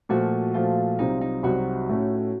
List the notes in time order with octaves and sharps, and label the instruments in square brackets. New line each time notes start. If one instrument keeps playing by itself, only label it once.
[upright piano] A#2 F3 A3 [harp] F#4
[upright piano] A#2 F3 A3 [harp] F4
[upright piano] C2 C3 F#3 C4 [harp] D#4
[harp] D#4
[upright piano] C2 C3 F#3 C4 [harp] F#4
[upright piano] A2 A3 C#4